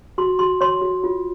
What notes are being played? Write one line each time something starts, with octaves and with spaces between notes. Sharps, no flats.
F#4 C6
F#4 C6
C#5 C6
F#4
F4